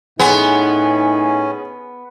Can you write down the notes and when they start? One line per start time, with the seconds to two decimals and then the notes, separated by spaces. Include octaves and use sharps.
0.20 A2 B3 C#4 D#4 G#4